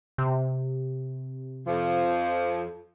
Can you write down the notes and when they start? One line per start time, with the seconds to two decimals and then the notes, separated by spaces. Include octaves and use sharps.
0.18 C3
1.67 F2 F3